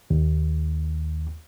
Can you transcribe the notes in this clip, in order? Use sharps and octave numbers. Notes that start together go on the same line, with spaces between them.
D#2